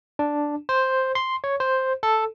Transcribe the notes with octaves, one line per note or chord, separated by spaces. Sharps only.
D4
C5
C6
C#5
C5
A4